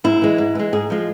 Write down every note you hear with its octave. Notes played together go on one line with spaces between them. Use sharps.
G#2 E4
E3 G#3
G#2
E3 G#3
G#2 G#4
F3 G#3